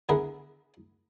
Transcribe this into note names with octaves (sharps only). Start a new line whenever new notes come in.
D3 B3 E4 G#4 A#4 B4